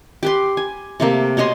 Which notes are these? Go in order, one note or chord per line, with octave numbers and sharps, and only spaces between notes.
G4 B4 C6
G#5
C3 A3 A#3
B2 C#5 D#5 C6